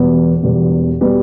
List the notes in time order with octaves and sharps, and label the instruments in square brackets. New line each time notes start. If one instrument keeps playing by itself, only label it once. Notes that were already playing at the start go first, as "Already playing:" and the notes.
Already playing: [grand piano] E1 E2 B2 G3 B3
E1 E2 B2 G3 B3
B2 G3 B3